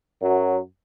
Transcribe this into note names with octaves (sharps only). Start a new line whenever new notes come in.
F#2 F#3